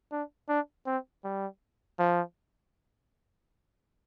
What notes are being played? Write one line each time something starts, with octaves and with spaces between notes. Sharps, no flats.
D4
D4
C4
G3
F3